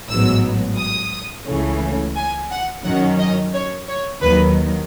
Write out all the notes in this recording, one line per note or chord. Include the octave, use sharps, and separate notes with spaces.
A1 G#2 F#3 B3 E6
D#6
C#2 C#3 E3 A3 C#4
G#5
F#5
F#2 D#3 F#3 C#4 F#5
D#5
C#5
C#5
D#2 D#3 F#3 B4